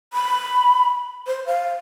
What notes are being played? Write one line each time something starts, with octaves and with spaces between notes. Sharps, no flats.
B5
C5
F5